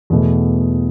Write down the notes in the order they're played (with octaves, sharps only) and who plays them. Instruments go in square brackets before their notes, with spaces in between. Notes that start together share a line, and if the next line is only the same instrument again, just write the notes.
[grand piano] E2 B2 A3